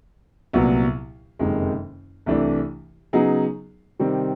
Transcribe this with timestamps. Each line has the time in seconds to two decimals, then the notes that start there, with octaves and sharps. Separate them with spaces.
0.53 C2 A#2 F#3 B3
1.39 F#1 F2 C3 D#3 G#3
2.26 C2 C3 E3 A3 D4
3.13 C#3 F#3 B3 D#4 G#4
4.00 C3 D#3 G3 C4